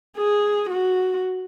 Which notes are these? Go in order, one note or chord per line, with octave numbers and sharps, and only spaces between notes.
G#4
F#4